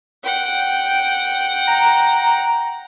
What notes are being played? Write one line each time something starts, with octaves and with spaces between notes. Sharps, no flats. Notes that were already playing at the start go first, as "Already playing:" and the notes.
F#5 G5
A#5